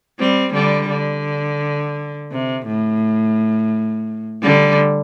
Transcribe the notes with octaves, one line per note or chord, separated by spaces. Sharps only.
G3 C4
D3 G3
D3
C3
A2
D3 G3